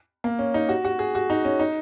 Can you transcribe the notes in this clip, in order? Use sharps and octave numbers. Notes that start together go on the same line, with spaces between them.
A#3
C#4
D#4
F#4
F#4
G#4
F#4
D#4
C#4
D#4